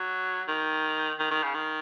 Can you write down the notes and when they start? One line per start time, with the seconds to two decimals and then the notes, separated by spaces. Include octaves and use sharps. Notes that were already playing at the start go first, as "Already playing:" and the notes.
Already playing: F#3
0.48 D#3
1.19 D#3
1.31 D#3
1.43 C#3
1.54 D#3